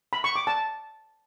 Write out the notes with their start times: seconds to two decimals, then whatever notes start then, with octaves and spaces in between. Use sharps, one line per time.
0.13 B5
0.24 C#6
0.36 D6
0.47 A5